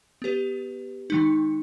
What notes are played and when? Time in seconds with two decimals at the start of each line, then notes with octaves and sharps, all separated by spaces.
0.22 B3 G4 B4
1.10 D#3 G#3 D#4